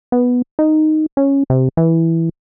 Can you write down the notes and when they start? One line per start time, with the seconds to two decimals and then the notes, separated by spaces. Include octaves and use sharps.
0.12 B3
0.59 D#4
1.17 C#4
1.50 C3
1.77 E3